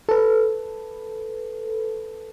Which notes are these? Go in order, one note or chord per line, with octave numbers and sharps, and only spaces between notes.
A4 B4